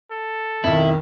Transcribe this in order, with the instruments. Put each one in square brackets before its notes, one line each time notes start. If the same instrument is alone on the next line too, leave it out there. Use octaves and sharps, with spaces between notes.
[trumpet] A4
[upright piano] B1 F2 [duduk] D#3 [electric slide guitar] E4